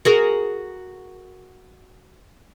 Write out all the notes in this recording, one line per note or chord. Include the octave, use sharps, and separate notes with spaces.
F#4 G#4 A#4